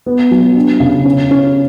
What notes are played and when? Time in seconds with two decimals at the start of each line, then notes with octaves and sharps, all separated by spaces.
0.06 B3
0.31 F#3
0.56 D4
0.80 C#3
1.05 C#4
1.31 C#4